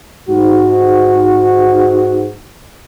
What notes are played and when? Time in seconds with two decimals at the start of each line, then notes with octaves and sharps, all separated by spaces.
0.30 G#2 F#4